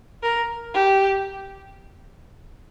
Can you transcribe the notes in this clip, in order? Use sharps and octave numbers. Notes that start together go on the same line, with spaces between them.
A#4
G4